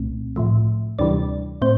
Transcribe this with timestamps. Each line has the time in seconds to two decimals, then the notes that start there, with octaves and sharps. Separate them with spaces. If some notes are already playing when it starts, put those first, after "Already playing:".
Already playing: C2 A#2 A3 C4
0.36 A2 F3 A3
0.99 D2 C3 E3 G3 D4 D5
1.62 A2 C4 C5